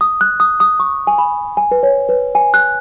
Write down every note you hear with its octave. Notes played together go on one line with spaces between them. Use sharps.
D#6
F#6
D#6
D#6
C#6
G#5
B5
G#5
B4
C#5
B4
G#5
F#6